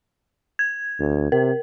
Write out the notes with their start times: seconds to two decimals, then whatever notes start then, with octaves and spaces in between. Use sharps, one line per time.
0.59 G#6
1.00 D2
1.32 C3 A#4